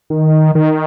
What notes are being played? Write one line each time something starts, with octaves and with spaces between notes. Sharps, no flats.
D#3
D#3